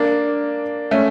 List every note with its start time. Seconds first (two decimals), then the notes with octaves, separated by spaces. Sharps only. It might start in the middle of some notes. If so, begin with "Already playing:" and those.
Already playing: A#3 D4
0.91 A3 C#4